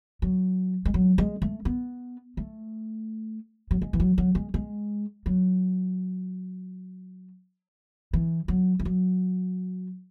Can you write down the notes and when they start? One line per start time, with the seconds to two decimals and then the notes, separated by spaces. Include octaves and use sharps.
0.22 F#3
0.85 G#3
0.94 F#3
1.18 G#3
1.42 A3
1.65 B3
2.37 A3
3.71 F#3
3.82 G#3
3.93 E3
4.00 F#3
4.18 F#3
4.35 G#3
4.54 G#3
5.26 F#3
8.13 E3
8.48 F#3
8.80 E3
8.85 F#3